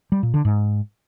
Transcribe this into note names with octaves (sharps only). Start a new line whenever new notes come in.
G3
A#2
D3
G#2